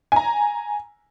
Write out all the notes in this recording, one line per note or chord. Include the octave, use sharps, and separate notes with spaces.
G#5 A#5